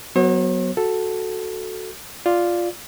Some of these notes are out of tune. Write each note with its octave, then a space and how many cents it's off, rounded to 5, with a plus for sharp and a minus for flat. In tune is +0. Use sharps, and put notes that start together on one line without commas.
F#3 +5 B3 +0 C#5 -45
F#4 +5 A4 +0
F4 +0 D5 +0